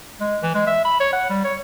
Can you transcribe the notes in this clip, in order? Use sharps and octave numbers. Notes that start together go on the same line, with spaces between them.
G#3
E3
G#3
E5
B5
C#5
F#5
G3
C#5